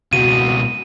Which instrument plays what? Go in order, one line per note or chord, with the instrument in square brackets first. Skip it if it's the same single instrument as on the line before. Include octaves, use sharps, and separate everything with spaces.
[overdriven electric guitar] C#2 B2 [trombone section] F#4 [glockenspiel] D#7